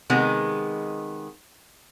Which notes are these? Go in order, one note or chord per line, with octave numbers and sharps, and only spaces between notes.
C3 D#3 G#3 B3